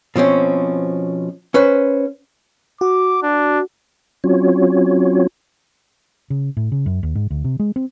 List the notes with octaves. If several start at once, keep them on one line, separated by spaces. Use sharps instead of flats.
B2 F3 C4 C#4
C#4 B4 C5
F#4 D6
D4
F#3 C4 C#4 F4 F#4 C#5
C#3
A2
C#3
F#2
D#2
G#2
D2
C3
G#3
C4